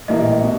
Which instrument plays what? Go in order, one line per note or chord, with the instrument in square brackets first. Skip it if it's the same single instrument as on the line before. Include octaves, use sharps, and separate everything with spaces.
[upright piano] A#1 A2 E3 G3 A#3 [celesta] D#5
[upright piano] B2